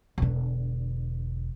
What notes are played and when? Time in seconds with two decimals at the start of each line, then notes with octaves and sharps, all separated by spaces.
0.18 E1 D3